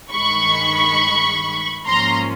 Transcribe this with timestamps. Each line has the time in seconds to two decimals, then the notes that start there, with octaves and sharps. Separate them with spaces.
0.11 G2 D#3 G#3 B5 C#6
1.86 G#2 F3 A#3 C#4 A#5 C6